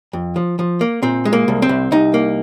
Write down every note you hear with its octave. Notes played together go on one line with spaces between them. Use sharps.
F2
F3
F3
A#3
A#2 C4
G#3
A#3
C2
C4
C2
C2 D#4
A#3